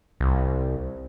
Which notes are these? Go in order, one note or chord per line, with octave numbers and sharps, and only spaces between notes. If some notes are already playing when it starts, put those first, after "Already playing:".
C2